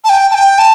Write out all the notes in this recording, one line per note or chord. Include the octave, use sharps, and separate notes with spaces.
A5
G5
A5
G5
A5